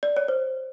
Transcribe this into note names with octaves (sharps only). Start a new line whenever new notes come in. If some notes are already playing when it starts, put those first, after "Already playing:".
D5
C#5
C5